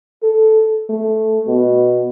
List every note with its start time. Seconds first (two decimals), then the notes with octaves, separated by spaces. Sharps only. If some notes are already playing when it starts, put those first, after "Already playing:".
0.23 A4
0.89 A3
1.47 B2